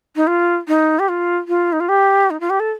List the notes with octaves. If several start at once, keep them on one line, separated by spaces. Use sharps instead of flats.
D#4
F4
D#4
G4
F4
F4
D#4
F4
G4
D#4
F4
G4
A4